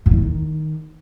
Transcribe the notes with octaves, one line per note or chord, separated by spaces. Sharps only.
F#2
E2
G2
D#3